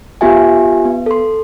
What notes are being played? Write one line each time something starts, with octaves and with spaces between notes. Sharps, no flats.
B3 F4 G4 E5 G#5
B3
A4 C6